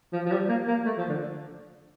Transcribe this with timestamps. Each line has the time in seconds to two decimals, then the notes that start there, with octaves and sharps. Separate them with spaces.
0.13 F3
0.26 F3
0.32 G3
0.49 A#3
0.68 A#3
0.86 A3
0.98 F3
1.09 D3